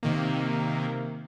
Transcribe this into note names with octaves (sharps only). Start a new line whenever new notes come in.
C3 D#3 A#3